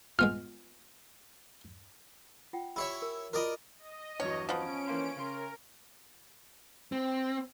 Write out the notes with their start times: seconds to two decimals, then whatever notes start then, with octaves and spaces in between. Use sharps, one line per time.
0.19 G#3 B3 F4 F6
2.53 F4 F#5 G5
2.76 E4 G4 C#5 D5 E5 B5
3.02 A#4 G#5
3.33 F4 F#4 A#4 D5 D#5
3.78 D#5
4.20 E2 G2 F#3 C#5
4.49 F3 B3 C#4 D7
4.87 E3 A#3 C5
5.16 C#3 A#4 C6
6.92 C4